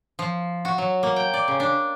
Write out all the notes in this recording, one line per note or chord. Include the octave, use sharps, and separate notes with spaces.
F3
F#4
F#3
A#3
G5
D5
C#3
D4